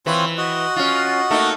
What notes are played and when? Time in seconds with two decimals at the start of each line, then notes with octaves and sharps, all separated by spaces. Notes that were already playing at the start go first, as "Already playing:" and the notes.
0.06 E3 C4 F4 B4 C#5
0.38 F#4 D#5 F#5
0.76 C#4 F4
1.31 A3 A#3 D#4